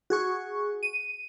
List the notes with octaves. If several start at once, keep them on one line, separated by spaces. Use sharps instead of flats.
F#4 G#4 C#6
D#7